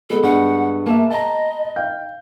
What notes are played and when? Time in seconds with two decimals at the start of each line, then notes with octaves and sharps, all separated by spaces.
0.10 G#3 B3 A4
0.23 G2 F#5
0.86 A#3 E5 A5
1.10 D#5 A5 A#5
1.76 F5 G5 G6